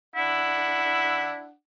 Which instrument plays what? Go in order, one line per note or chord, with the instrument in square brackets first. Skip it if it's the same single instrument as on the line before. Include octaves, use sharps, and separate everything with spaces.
[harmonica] D4 F#5 [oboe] E4